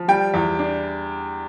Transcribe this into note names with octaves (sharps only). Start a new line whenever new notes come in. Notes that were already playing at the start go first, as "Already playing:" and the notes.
Already playing: F3
G3 G5
E2
D4